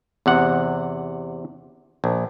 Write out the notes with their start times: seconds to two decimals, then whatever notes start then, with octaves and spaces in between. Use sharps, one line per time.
0.26 E2 C3 F#5
2.04 A#1